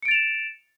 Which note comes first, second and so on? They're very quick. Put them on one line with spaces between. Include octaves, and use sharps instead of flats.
C#7 D7 A6 F7 E7